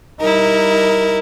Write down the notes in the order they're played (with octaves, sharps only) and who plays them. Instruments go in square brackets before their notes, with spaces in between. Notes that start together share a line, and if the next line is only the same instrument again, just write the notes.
[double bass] G3 D#4 [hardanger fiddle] E4 A#4